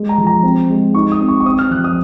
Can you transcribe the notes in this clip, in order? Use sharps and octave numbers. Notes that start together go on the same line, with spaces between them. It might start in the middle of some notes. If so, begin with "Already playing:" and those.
Already playing: G#3
A#5
F3
A#5
C4
G#3
D#4 C#6
D#6
C4
C#6
C#6
C4 D#6
F6
F3 F#6
D#6